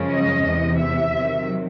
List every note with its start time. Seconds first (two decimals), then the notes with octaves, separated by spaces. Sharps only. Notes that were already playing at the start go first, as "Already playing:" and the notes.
Already playing: F#2 C#3 F3 G#3 C#4
0.10 D#5
0.44 E2 C3 E3
0.79 E5
1.13 C3 D#3 F#3